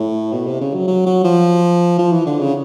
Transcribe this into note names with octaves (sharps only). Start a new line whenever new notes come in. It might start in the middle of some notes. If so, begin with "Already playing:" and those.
Already playing: A2
B2
C3
C#3
F#3
F#3
F#3
F3
F3
E3
D3
C#3